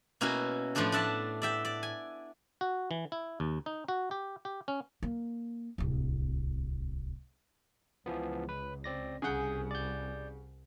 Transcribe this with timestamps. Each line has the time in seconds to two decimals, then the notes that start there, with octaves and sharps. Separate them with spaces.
0.21 B2 A#3 C#4 E4 F#4
0.75 A2 F3 A3 B3 D4 A4
0.92 D4 D5 E5 F#5 A5
1.42 D5 E5 G5
1.65 D5
1.83 G#5
2.61 F#4
2.91 E3
3.12 E4
3.40 D#2
3.66 D#4
3.88 F#4
4.11 G4
4.45 G4
4.68 C#4
5.03 A#3
5.78 D1 C2
8.06 C#2 E3 F3 B3
8.49 B4
8.84 C4 D5 A#6
9.22 C2 C#3 G#4 F#5 G6
9.71 D5 G6